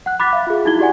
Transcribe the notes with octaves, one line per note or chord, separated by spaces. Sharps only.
F#5 F#6
B5 D6 F#6 A6 B6
E5 F5 B5
F4 G#4
D#4 E4 F#4 G#6 G7
F#4 G4 D5 F#5 G#5